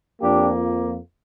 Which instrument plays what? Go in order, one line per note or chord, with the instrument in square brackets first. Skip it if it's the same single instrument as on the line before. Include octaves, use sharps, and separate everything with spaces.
[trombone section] F2 F3 A#3 D4 G4